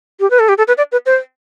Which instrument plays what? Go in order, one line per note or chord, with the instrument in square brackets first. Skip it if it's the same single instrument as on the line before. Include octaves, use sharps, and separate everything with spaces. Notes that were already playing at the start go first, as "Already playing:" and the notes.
[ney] G4
B4
A4
G4
A4
B4
D5
B4
C5